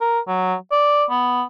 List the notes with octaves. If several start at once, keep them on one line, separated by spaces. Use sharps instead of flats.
A#4
F#3
D5
B3